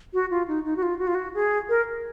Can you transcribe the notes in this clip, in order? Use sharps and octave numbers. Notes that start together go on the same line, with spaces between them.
F#4
F4
D#4
D#4
F#4
F4
F#4
F4
F#4
G#4
A#4